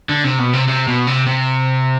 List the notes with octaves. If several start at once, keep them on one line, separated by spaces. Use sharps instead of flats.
D3
C3
B2
C3
C3
B2
C3
C3